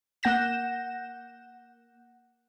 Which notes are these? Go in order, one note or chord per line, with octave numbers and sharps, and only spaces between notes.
A#3 F#5 G6 A#6 E7